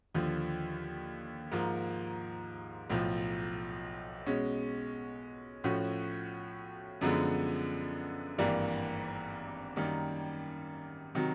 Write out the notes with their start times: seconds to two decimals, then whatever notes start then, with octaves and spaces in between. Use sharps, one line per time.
0.15 D#2 D3 F3
1.52 G#2 F3 A#3
2.90 B1 A2 F3
4.27 B2 G#3 C#4
5.64 A2 F3 A3 C#4 F#4
7.01 F#2 D3 F3 G#3 B3
8.38 G#1 G2 E3 G3 A#3
9.76 F#2 D#3 G3 A#3
11.15 C3 D#3 F#3